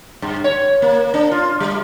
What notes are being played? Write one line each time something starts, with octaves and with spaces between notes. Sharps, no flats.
G2
C#5
A#3
D4
F4
G3